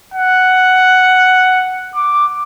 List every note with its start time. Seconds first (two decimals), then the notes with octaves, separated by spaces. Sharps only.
0.14 F#5
1.96 D6